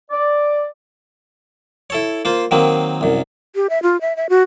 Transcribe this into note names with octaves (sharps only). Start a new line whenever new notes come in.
D5
E4 A4 C#5
A#3 F4 C5
D#3 F#3 A#3 C4
C2 F#2
G4
E5
F4
E5
E5
F#4